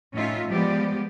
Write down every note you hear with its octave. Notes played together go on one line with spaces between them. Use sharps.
A2 C#4 D#4 F4 E5
F3 G3 G#3 B3 G4 D5